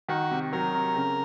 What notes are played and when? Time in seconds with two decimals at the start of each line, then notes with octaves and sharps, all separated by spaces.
0.08 D#3 F#4
0.31 C3
0.53 F#3 A#4
0.74 C3
0.96 C#3